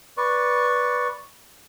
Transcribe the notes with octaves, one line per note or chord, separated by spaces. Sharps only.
B4 D5 C#6